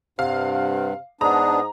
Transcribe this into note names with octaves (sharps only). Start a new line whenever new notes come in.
G2 C3 F5 F#5
G#2 B3 D4 A#5 D#6